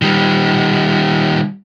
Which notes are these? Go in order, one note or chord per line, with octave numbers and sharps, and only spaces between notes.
D#3 G3